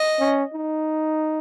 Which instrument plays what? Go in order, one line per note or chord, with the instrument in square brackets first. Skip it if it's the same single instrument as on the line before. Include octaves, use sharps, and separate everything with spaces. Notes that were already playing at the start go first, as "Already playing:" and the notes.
Already playing: [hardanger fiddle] D#5
[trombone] C#4
D#4